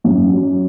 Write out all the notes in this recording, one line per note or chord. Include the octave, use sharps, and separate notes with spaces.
F#2
F#3